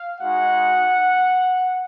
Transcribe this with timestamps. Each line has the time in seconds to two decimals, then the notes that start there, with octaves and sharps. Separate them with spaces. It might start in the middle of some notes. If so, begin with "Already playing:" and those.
Already playing: F5
0.21 G#3 D#4 F#4 F#5